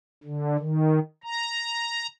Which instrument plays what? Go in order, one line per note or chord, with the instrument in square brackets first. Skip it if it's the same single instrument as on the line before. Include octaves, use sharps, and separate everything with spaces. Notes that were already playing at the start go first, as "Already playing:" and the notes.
[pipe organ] D3
D#3
A#5